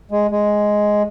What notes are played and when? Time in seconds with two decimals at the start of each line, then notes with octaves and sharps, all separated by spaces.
0.11 G#3
0.31 G#3